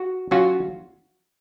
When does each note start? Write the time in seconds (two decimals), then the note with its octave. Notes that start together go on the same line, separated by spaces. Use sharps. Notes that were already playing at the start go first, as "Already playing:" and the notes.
Already playing: F#4
0.31 F#3 C#4 F4 F#4